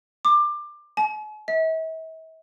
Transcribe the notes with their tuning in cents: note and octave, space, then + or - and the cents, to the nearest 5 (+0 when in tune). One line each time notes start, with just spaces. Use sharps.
D6 +20
G#5 +45
E5 -45